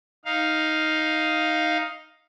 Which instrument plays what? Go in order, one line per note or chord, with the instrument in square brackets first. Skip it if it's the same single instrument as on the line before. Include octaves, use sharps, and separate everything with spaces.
[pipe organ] D#4 F5